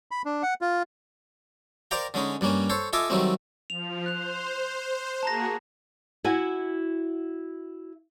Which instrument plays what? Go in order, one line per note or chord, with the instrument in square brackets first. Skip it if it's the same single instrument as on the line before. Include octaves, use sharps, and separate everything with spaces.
[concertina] B5
D4
F#5
F4
[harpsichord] A#4 C5 D5 F5 G5 A#5
D3 G#3 C#4 D#4
G2 G3 A#3 C#4
A4 C5 C#5
F4 A4 D#5 E5 G#5 D6
D#3 F#3 G3 A3 C4
[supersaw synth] F3 [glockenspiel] F7
[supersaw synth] C5 [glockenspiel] F#6 F7
[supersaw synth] A#3 F#4 G#4 [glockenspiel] A5 A#5 A#6
[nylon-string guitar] E4 F#4 G#5